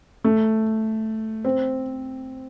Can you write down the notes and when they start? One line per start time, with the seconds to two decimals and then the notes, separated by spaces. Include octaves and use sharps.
0.24 A3
1.45 C4